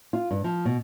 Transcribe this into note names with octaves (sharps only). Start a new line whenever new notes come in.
F4
G2
F3
B2